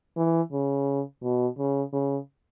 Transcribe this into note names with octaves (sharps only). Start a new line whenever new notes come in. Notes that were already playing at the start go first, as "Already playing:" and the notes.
E3
C#3
B2
C#3
C#3